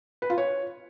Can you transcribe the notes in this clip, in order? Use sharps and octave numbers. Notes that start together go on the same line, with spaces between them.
B4
F4
C#5